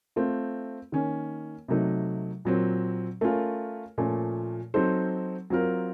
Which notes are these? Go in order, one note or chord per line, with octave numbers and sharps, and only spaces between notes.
A3 C4 F4
D#3 A#3 C#4
C3 F#3 A3 D#4
A#2 F#3 C4
A3 C#4 F4 A#4
A#2 F3 A3 C#4
F#3 C4 D#4 A4 C5
F#3 C4 F4 A#4